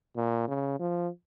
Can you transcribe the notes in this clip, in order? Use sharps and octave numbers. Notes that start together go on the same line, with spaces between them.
A#2
C#3
F3